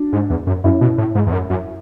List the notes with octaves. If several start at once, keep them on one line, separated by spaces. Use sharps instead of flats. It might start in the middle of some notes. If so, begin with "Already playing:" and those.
Already playing: D4 F#4
G#2
E2
F#2
F#2 C#4 E4
B2
A2
G#2
E2
F#2
F#2